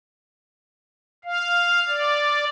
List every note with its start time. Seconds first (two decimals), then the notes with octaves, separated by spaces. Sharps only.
1.24 F5
1.88 D5